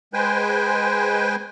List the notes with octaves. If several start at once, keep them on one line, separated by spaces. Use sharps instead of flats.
G#3 B4 C5 G5 G#5